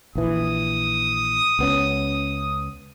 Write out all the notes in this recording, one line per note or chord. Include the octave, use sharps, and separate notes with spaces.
A#1 E3 D#6
C#2 B3 C#4